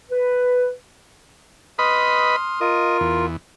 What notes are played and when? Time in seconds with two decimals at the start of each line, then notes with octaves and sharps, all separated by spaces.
0.10 B4
1.79 B4 D#5 B5 C6 D#6 F6
2.61 F4 A#4 D#5
3.01 E2